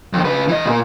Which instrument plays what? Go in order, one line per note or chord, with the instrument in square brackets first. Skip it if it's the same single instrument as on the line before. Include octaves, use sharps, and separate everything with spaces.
[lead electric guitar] F2 D#3
C#3 B4
E3 D#5
C#2 A#2